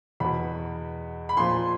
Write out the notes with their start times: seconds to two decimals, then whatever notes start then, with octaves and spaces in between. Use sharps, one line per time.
0.20 E2 B2 B5
1.29 B5
1.37 A#2 F3 C6